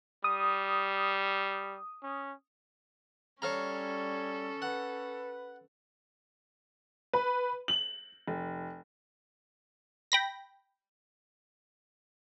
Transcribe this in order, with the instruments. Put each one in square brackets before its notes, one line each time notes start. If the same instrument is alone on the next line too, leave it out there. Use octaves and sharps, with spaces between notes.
[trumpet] G3 [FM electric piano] D#6
[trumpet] C#4
[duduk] G3 [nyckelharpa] C#4 [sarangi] A4 [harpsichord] C#5 F5 A#5
[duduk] B4 [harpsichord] F#5
[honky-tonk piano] B4
F#7
F1
[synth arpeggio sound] G5 B5 A#6